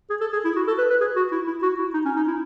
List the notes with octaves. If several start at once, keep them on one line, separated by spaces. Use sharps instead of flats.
G#4
A4
G#4
E4
F#4
A4
B4
B4
G#4
F#4
E4
E4
F#4
E4
D#4
C#4
D#4
E4